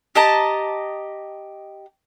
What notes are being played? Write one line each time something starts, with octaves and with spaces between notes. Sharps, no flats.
G4 D#5 A5 A#5